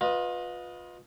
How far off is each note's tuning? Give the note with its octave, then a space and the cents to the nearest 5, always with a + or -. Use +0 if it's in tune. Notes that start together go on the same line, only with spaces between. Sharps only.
F4 +30 B4 +0 D#5 +5